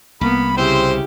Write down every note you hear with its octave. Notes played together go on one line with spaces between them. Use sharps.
C2 A#3 B3 B5
C#3 C4 E4 G4 C5